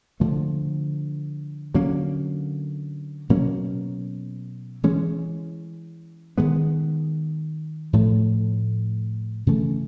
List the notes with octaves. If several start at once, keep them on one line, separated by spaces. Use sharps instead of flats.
D3 F3 A3
D3 F#3 A#3 C#4
B2 F#3 A#3 C#4
E3 G#3 C#4
D#3 G#3 B3
A2 F3 A3
C#3 E3 A3